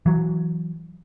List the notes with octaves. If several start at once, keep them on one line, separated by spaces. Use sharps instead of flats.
E3 F#3